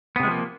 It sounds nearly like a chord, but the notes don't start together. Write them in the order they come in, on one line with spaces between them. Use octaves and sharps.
B3 C3 G#3 F3 A#3